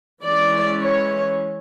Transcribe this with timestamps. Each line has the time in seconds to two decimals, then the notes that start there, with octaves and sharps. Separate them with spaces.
0.25 E3 G#3 C#4 D5
0.80 C#5